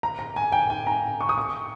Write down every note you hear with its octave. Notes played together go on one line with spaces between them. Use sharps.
A#5
A#5
G#5
G5
G#5
A#5
C#6
D#6
C#6